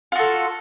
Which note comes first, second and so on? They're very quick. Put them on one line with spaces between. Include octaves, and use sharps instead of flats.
F4 F#4 A4